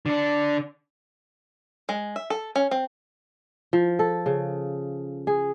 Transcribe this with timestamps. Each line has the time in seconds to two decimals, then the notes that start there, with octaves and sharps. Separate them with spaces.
0.06 D3 D4
1.89 G#3
2.16 E5
2.30 A4
2.56 C#4
2.71 C4
3.73 F3
3.99 A4
4.26 C#3
5.27 G#4